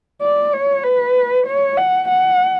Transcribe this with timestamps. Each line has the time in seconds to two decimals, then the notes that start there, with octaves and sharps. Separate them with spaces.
0.22 D5
0.53 C#5
0.84 B4
1.46 C#5
1.77 F#5
2.08 F#5